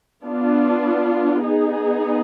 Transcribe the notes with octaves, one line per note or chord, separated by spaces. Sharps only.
B3 D4 F4
B3 D#4 G#4